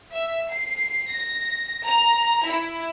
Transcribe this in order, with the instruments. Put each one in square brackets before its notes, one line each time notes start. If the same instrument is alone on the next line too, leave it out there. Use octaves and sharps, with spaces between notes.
[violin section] E5
C7
A#6
A#5
E4